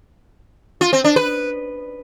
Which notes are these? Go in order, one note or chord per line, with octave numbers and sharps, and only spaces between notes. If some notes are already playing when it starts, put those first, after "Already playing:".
F4
C4
D4
B4